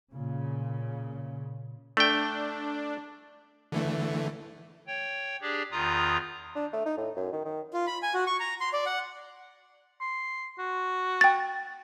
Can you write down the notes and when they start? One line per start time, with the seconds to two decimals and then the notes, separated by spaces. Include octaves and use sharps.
0.11 A#2 C#3
1.97 A3 D4 G5
3.72 D3 E3 A3
4.87 C#5 G5
5.42 D4 G4 G#4 D5
5.72 E2 D#3 F4 A#5 D#6
6.55 D4
6.73 A3
6.86 D#4
6.97 A2
7.17 F#2
7.33 D#3
7.45 D#3
7.73 F4
7.87 B5
8.03 G#5
8.14 F#4
8.27 C#6
8.40 A#5
8.61 C6
8.73 D5
8.86 F#5
10.01 C6
10.59 F#4
11.21 G5 A6